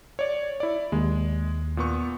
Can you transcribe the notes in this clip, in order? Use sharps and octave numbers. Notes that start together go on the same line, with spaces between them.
C#5 D5
E4 D5
D#2 G#3
A#2 B3 C#6